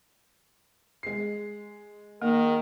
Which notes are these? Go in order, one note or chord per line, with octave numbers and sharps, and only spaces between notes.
G#3 C7
D#3 A#3 A#4